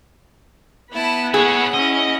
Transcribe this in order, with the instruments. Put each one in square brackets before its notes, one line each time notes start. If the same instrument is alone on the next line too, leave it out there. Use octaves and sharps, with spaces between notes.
[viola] B3 B5 [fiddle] E4 A5
[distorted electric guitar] E4 C#5 [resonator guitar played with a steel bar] G#4 [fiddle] F#5
[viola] C#4 E4 [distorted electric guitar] D#5